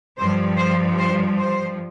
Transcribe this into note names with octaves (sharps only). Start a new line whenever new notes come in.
G2 F3 C5
C5
C5
C5